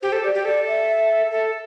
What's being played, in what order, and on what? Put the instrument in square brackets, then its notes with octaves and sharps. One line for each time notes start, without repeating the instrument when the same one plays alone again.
[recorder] G4 [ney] C5
[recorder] A4
[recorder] G4 [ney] D5
[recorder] G4
[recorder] A4 [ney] D5
[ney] E5
[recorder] A4